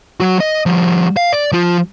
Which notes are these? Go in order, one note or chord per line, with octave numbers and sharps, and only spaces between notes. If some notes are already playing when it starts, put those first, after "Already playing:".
F#3 F#4
D#5
F3 G3
F5
D5
F3 F4